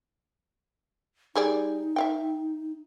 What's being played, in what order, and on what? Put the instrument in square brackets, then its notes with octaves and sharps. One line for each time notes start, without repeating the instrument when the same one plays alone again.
[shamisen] G3 G#4 D5 [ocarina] D#4
[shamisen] E5 F5 G5